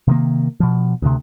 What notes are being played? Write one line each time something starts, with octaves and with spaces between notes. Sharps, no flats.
C3 D#3 A#3
B2 F3
D2 C3